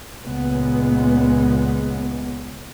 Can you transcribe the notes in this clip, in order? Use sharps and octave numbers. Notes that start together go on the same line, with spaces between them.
C#2 A#2 C#3 G#3 B3